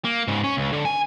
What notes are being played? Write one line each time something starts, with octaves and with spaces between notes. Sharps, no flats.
A#3
G#2 C#3
C#4
C#2
D3
G#5